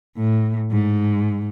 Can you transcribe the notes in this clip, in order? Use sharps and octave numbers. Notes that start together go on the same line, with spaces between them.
A2
G#2